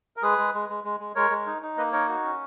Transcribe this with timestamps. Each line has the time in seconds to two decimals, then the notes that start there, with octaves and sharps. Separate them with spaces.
0.17 A#4
0.22 G#3 G#4 B4
0.38 G#3
0.54 G#3
0.69 G#3
0.84 G#3
1.00 G#3
1.15 G#3 A#4 C#5
1.30 G#3
1.46 D#4
1.62 D#4
1.77 A#3 B4 D#5
1.92 D#4 A#4 C#5
2.08 F#4
2.24 C#4